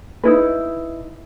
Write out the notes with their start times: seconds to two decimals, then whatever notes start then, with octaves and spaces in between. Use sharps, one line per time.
0.24 D#4 E4 B4